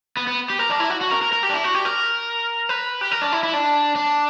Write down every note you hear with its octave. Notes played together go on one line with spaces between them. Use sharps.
B3
B3
G4
A#4
D4
E4
F#4
F#4
A#4
A#4
A#4
G4
D4
E4
F#4
G4
A#4
B4
G4
A#4
D4
E4
E4
D4
D4